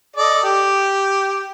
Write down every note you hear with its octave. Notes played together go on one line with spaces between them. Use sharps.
A4 D5 D#5
G4